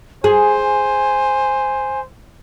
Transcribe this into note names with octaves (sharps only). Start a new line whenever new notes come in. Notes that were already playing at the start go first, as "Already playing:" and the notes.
G#4 C5 G#5